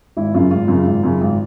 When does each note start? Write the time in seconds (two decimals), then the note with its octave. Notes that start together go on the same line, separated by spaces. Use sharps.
0.17 G#1 E4
0.34 F#2 C#3 F4
0.51 G#1 F4
0.68 F#2 C#3
0.85 G#1
1.03 F#2 C#3
1.21 G#1